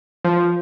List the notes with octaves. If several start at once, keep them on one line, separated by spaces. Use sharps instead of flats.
F3